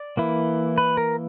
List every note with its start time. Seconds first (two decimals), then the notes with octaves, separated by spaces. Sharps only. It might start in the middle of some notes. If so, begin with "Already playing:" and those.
Already playing: D5
0.17 E3 A#3 E4
0.78 B4
0.97 A#4